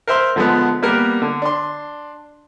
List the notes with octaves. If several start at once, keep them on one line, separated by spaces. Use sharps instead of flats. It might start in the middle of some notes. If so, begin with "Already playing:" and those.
A#4 C5 E5 C6
D3 F3 G#3 A3 B3
G3 A#3 B3 A#4
D3
D4 C6